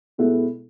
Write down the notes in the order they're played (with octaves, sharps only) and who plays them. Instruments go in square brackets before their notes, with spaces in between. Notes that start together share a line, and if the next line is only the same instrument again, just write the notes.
[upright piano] B2 G#3 B3 E4 A4